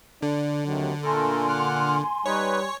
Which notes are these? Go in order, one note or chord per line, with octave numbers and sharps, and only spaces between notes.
D3 D4
D#2 C3 D#3 F#3
A#2 A3 A4 A#4 G#5 C6
F#5 D6 F6
G3 D#4 B4 C#5